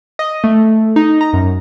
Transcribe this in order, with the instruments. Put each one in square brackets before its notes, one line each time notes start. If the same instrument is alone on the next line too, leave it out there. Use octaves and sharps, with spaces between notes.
[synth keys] D#5
A3
D#4
A#5
F#2